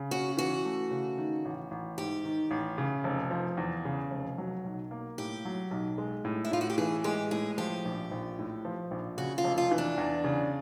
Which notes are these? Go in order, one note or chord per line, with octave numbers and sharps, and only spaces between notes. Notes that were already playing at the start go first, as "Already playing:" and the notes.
Already playing: C#3
C#4 F#4
E3 F#4
A3
C#3
D#3
A1
A1
G#2 G4
D#3
A1
C#3
F1
F3
E2
C#3
F1
F#3
B1
A#3
A2 G4
F#3
B1
G#3
A2
E4
A2 F4
F#4
G4
E3 G#4
G#3 G4
A2 G#4
F3 G4
A#1
A#1
A2
F3
A#1
C#3 F#4
F4
F1
F4
E3
D4
E2
C#3